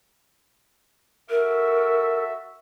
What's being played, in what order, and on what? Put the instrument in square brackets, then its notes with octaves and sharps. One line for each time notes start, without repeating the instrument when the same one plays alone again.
[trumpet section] F#4 A4 E5 [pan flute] A#4